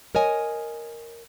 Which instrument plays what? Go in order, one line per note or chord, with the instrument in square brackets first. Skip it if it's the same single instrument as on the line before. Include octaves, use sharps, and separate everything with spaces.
[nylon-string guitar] A#4 C#5 D#5 G#5